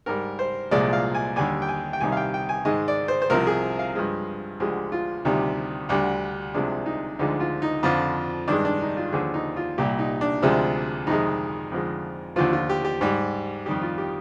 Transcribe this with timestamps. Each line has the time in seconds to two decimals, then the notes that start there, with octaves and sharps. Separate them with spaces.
0.06 G#2 G3 A#4
0.39 C5
0.71 C2 A#2 F3 G#3 D5
0.93 F5
1.15 G#5
1.36 D#2 D3 G3 G#5
1.62 G5
1.68 G#5
1.93 G5
2.01 C2 C3 D#3 G3 G#5
2.12 F5
2.17 G5
2.34 G5
2.49 G#5
2.65 G#2 D#3 G#3 D#5
2.88 D5
3.08 C5
3.22 C5
3.30 C2 C3 F3 A#4
3.47 G#4
3.79 F5
3.95 G2 F3 G#3
4.60 D2 D3 F3 G#3 G4
4.92 F4
5.25 D2 C3 D#3 G3
5.89 D2 D3 G3
6.54 C2 C3 F3 G#3 D4
6.86 D#4
7.19 D2 D3 F3 G#3 D#4
7.40 F4
7.62 D#4
7.83 F2 D3 F3 F4
8.48 G2 D#3 G#3 D4
8.65 D4
8.81 D#4
8.97 F4
9.12 D#2 D3 F3 G#4
9.34 D#4
9.56 F4
9.78 C2 A#2 G3 G4
9.99 D#4
10.21 D4
10.42 D2 C3 F3 G#3
11.07 F2 C3 D#3 G#3 D#4
11.72 F2 D3 F3 G#3
12.36 D#2 D3 F3 F4
12.53 F4
12.70 G4
12.85 G4
13.01 G#2 G3
13.66 F2 D#3 G3 G4
13.82 F4
13.98 G4